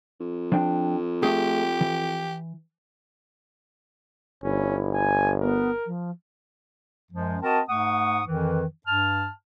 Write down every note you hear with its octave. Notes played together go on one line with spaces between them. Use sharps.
F2
F3 D4 G5
A3 G4 G#4
E3
G1 C#4 E4
G#5
B3 A#4
F3
F#2 F3 G#3
C4 F#4 A#4 D#5 A5
G#2 A3 F#5 C#6 D#6
F2 D#3 E3
G2 A5 F6